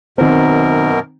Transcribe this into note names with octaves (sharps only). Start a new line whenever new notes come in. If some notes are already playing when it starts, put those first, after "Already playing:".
F#2 B2 D#3 C4 A#4